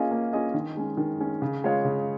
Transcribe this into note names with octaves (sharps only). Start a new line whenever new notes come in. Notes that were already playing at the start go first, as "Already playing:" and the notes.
Already playing: A#3 C#4 F4 G#4 D#5
A#3
C#4 F4 G#4 D#5
D#3
G#3 C#4
D#3
G#3 C#4
C#3
G#3 F4 C#5 F5
C#3